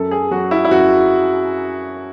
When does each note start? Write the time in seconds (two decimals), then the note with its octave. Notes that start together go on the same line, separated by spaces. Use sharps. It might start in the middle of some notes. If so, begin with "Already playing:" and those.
Already playing: F#2 A4
0.11 G#4
0.31 F#3 F#4
0.51 E4
0.65 E4
0.71 F#2 F#4